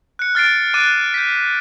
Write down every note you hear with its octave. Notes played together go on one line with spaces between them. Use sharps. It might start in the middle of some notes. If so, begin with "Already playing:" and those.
F#6 C#7
F6 A6 C7 D7
D6 F6 F#6 A6 D7 D#7
G6 B6